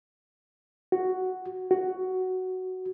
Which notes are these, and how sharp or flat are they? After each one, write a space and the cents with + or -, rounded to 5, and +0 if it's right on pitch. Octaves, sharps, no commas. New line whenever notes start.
F#4 +5
F#4 +10